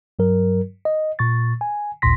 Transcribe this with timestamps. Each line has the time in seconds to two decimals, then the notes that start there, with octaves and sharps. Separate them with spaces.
0.19 G2 F#3 A#4
0.85 D#5
1.19 A#2 C#6 A6
1.61 G#5
2.02 A1 D#2 A#2 C6 A#6 B6